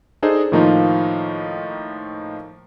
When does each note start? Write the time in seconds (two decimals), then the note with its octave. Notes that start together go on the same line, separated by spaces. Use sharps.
0.23 D4 D#4 G#4 A4 C5 D#5
0.52 A2 D#3 F3 A#3 D#4 F4